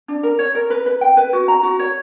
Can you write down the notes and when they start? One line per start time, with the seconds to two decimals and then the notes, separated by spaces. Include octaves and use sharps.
0.08 D4
0.23 A#4
0.39 C#5
0.55 A#4
0.70 B4
0.86 B4
1.01 G5
1.17 B4
1.33 F#4
1.48 A#5
1.63 F#4
1.79 C#5